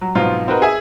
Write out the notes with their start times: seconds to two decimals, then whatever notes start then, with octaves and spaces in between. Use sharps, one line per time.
0.01 F#3
0.15 G#2 B2 F3 F#3 C4 F4
0.48 C4 D#4 F#4 A#4 B4
0.62 G#4 E5 G#5